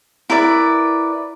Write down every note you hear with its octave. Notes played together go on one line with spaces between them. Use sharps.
E4 A#4 B4 D5